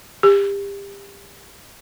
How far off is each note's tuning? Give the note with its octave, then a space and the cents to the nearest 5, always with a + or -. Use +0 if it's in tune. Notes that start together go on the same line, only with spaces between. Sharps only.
G4 +30